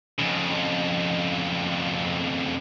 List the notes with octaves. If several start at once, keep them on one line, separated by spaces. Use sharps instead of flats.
F2 C#3